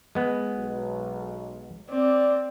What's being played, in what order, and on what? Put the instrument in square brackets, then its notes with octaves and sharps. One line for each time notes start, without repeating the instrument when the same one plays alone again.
[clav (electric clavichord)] G#3 B3
[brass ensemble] B1
[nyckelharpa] C4 [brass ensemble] D5